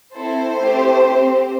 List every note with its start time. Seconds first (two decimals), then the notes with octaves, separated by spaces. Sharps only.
0.14 C4 E4 A4 C5
0.59 A3 C4 E4 G4
1.05 C4 G4